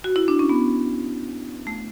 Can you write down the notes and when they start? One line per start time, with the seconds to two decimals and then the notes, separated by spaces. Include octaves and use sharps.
0.04 F#4
0.16 E4
0.28 D4
0.39 C#4
0.49 B3
1.67 A3